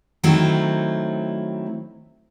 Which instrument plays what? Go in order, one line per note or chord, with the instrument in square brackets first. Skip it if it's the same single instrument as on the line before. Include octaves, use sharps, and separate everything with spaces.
[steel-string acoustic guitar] D#3 F#3 A3 C4 E4